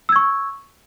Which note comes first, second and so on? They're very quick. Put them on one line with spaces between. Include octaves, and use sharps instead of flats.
E6 G#6 C#6